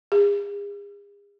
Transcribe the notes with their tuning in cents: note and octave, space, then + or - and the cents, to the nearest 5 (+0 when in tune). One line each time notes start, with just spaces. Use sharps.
G#4 -45